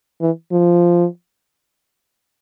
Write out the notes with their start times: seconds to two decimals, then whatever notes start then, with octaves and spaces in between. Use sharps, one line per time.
0.21 E3
0.52 F3